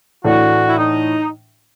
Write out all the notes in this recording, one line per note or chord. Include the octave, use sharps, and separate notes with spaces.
A2 E3 A3 D4 F#4
E4
D#4